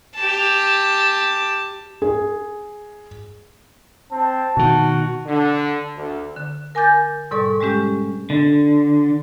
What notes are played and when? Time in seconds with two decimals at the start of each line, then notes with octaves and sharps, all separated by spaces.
0.15 G4 A5
2.02 G#4
4.11 C4 A5
4.57 B2 D#3 F#4
5.27 D3
5.96 D2
6.36 D3
6.75 A#4 G#5 D6 G6 A6
7.31 G#2 B2 G3 A4 D5 C#6
7.60 G3 G#3 C#4 G4
8.30 D3